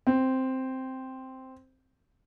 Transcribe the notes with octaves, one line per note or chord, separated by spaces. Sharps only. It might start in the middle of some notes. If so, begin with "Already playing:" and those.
C4